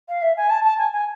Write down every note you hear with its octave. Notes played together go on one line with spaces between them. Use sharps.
F5
E5
G#5
A5
A5
G#5
G#5